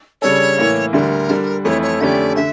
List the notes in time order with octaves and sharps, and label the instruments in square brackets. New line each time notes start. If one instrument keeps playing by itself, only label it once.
[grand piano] C#3 G3 D4 A4 [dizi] C#5
[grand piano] A2 E3 A#3
[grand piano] D2 D3 G3 D4 [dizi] A#4
[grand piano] D3 G3 D4
[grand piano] F2 E3 A3 E4 [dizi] C#5
[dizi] C#5
[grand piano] F2 D3 A3 C#4 G4 [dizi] D5 E5
[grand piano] D3 [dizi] E5